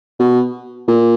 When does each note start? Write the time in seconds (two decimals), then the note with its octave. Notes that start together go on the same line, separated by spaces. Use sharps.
0.19 B2
0.88 A#2